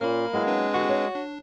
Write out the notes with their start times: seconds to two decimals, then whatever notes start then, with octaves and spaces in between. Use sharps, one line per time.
0.01 A#2 A#3 C#4 B5 F6
0.33 F#3 G#3 B3 E4
0.47 C4 D4 B4
0.74 E2 D3 F#4 G4
0.89 C#5
1.15 D4